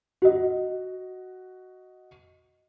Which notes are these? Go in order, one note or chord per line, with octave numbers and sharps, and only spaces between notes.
F#4 D#5